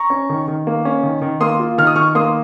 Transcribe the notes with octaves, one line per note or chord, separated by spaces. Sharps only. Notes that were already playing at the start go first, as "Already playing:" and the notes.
Already playing: A#5 C#6
C#4
D#3
D#3
A#3
C#4
D#3
D#3
A#3 C6 D#6
F4
D#3 F6
D#6
D#3 C#6 F6
A#3 C6 D#6